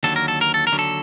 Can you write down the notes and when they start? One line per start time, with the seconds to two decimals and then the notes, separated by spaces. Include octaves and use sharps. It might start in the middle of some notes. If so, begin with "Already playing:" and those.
0.03 D#2 D3 F#3 A4
0.16 A#4
0.28 A4
0.41 A#4
0.54 A4
0.67 A#4
0.72 D#2 D3 F#3
0.79 A4